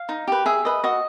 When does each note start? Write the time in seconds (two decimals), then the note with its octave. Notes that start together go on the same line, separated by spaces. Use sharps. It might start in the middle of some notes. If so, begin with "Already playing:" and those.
Already playing: F5
0.09 D#4
0.28 G4 B4
0.46 G#4 E5
0.65 B4 D#5
0.84 F#4 D#5